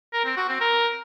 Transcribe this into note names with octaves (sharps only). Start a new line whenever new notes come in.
A#4
C4
F#4
C4
A#4